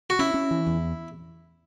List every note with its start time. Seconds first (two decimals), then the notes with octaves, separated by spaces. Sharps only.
0.10 F#4
0.19 C#4 E4
0.34 C#4
0.51 E3
0.67 E2